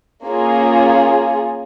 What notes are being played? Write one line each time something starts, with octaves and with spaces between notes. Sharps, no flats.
A#3 C#4 F4 G#4